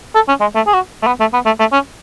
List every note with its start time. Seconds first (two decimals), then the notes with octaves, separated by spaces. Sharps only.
0.15 A4
0.28 C#4
0.41 G#3
0.55 A3
0.67 G#4
0.74 F#4
1.02 A3
1.07 B3
1.20 A3
1.34 B3
1.46 A3
1.59 A3
1.72 C#4